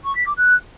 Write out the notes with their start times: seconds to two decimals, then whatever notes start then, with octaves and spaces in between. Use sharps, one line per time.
0.03 C#6
0.15 B6
0.26 D6
0.37 F#6